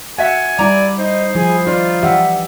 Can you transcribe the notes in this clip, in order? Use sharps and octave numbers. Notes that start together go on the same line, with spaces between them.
F#4 E5 F#5 G#5
G3 E4 D5 A#5
D#4 C5
F3 E4 G#4
D#4 F4 D5
E3 D4 G4 E5 F#5